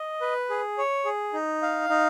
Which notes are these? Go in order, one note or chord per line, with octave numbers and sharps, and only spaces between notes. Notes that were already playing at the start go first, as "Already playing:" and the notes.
Already playing: D#5
B4
G#4
C#5
G#4
D#4
F5
D#4